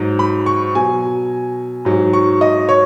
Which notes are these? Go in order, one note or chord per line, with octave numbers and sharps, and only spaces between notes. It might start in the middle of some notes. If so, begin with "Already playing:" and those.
Already playing: G#2 F#3
B5
C#6
B2 F#3 G#5
G#2 F#3
C#6
D#5
C#5